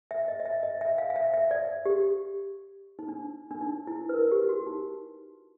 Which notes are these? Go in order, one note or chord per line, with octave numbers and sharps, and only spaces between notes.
E5
D#5
D#5
E5
D#5
E5
F5
F5
E5
E5
D5
G4
D#4
D4
D4
D#4
E4
B4
A#4
G4
F#4
D#4